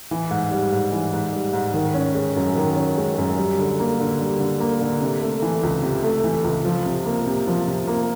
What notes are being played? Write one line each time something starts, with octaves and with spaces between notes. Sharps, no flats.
E3
G#2
G3
G#2
E3
G#2
G3
G#2
D#3
C#4
G#3
F#2
D#3
C#4
G#3
F#2
G3
D3
A#3
D3
G3
D3
A#3
D3
C3
A3
E3
C#2
C3
A3
E3
C#2
F3
C3
A#3
C3
F3
C3
A#3